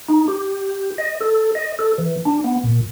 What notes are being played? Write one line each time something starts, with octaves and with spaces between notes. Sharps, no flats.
D#4
G4
D#5
A4
D#5
A4
E3
D4
B3
A#2